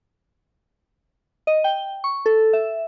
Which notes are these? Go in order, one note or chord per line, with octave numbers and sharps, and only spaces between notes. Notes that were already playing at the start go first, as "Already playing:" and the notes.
D#5
G5
C#6
A4
E5